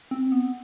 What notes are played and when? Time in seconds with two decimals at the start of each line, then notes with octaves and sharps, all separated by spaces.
0.11 C4
0.32 B3